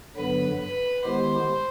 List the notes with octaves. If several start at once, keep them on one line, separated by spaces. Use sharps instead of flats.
G2 D3 F#3 B3 B4
B4
D#3 G#3 B3 E4 G4 C5